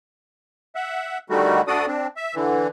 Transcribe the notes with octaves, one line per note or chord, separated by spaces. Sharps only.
E5 F#5
D3 D#3 G3 A3 F#4
D2 D4 F#4 A4 D5 D#6
C4 D4
E5
D3 E3